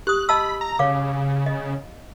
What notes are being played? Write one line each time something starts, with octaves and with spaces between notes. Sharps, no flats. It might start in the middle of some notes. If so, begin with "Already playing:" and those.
G4 D#6 F#6
D#5 A5 B5 E6
A#5
C#3 C#5 F5 D6
D#5